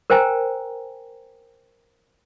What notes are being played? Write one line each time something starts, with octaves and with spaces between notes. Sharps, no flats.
A#4 C5 G5 G#5 A#5